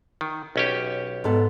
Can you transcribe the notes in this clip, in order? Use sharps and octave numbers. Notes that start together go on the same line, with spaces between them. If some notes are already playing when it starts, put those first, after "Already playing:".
D#3
B1 C#4 G4
G#2 B3 A4